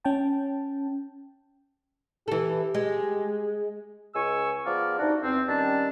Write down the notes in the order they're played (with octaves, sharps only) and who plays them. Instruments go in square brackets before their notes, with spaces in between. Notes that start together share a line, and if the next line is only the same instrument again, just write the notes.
[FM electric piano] C#4 G5 A5
[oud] E3 A4 [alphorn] G4
[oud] G#3
[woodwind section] C#2 G#3 G#5 C#6 E6
F3 B3 G#4 A#4 D5
C3 D4 D#4 F#4
E2 C4
D#3 G3 C#4 D4 A5